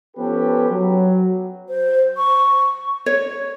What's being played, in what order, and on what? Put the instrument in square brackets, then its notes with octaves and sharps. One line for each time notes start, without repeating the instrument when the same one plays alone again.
[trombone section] F3 B3 C#4 G4 A4 B4
F#3
[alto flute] C5
C#6
[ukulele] C#5